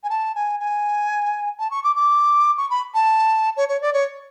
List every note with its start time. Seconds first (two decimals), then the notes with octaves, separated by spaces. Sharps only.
0.04 G#5
0.10 A5
0.35 G#5
0.60 G#5
1.59 A5
1.71 C#6
1.84 D6
1.96 D6
2.57 C#6
2.70 B5
2.94 A5
3.57 C#5
3.68 C#5
3.81 D5
3.93 C#5